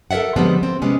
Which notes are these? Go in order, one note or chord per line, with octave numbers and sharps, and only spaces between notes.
A4 A#4 D5 E5 F#5
D3 F3 G3 G#3 B3 C4
C4
C3 G3 G#3 B3 C#4